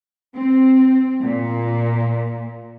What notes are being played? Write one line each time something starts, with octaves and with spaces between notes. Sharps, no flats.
C4
A#2